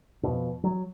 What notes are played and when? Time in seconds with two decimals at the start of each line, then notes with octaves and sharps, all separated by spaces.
0.23 F2 B2
0.64 F#3